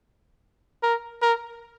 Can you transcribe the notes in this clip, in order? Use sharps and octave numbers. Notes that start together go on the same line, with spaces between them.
A#4
A#4